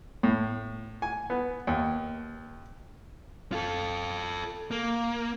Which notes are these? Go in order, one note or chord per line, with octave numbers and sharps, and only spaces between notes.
A2
G#5
B3
D#2
F4 A4
A#3